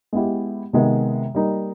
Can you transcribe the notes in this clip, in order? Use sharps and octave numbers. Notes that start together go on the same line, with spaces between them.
G#3 B3 E4 G4
C3 D#3 G#3 B3
G3 A#3 D#4